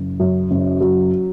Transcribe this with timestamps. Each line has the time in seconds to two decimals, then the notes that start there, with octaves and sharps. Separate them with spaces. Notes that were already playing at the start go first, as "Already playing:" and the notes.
Already playing: F#1
0.20 F#2
0.51 F#1
0.81 F#3